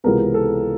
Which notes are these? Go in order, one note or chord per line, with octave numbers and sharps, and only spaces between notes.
C#2 C3 E3 G#3 B3 A#4
A4